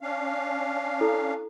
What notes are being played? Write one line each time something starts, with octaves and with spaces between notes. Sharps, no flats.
C#4 D4 F5
E4 A4